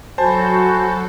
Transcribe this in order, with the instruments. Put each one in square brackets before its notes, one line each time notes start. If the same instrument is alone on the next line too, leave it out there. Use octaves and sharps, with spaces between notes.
[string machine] F#3 A4 [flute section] F#4 G6 [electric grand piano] C5 A5 [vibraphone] G#5 B5